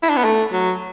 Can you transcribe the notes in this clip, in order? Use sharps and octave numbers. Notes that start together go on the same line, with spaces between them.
E4
D4
B3
A3
F#3